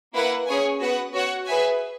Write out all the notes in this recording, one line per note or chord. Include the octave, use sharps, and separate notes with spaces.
A#3 E4 B4 F#5
C#4 G#4 C#5 G#5
B3 F#4 B4 F#5
F#4 C#5 F#5
G#4 B4 E5 G#5